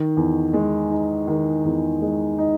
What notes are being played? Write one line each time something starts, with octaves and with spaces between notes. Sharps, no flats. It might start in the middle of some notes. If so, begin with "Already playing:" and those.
Already playing: D#3
E2
G#3
D#4
D#3
E2
G#3
D#4